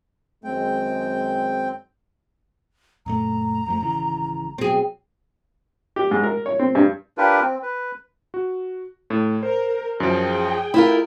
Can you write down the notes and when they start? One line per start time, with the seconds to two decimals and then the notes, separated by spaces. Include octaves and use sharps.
0.44 F#2 D#3 G#3 C4 G5
3.06 F#2 A#2 A3 A#5
3.66 F#2 F3 A3
3.81 G#1 C#3 E3
4.58 B2 F#3 C4 G#4
5.96 G4
6.11 G#2
6.23 A#4
6.46 C#5
6.59 C4
6.75 G2
7.18 D4 F4 G4 A#4 B4
7.42 C4
7.63 B4
8.34 F#4
9.10 A2
9.43 A#4 C5
10.00 F#2 F3 G#4 G5
10.74 E4 F4 A#4 B5